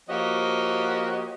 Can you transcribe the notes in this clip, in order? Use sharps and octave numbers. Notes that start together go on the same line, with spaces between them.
F3 A#3 F#4 G4 C#5 D#5